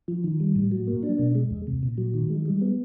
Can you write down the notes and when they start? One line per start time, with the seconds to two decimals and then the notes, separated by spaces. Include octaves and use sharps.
0.08 F3
0.24 D#3
0.40 G3
0.56 A2
0.72 F#3
0.87 A#3
1.03 D4
1.19 B2
1.35 G#3
1.51 E2
1.67 C3
1.83 A#2
1.98 F#3
2.14 D#3
2.30 G#3
2.46 G3
2.62 B3